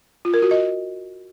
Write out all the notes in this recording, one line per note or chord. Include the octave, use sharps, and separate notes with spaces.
F4
A#4
F#4
D#5